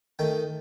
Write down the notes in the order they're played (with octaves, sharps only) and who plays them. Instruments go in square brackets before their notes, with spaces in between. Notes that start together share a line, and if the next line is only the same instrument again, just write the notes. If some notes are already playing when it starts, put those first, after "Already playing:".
[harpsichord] D#3 A3 D#4 G5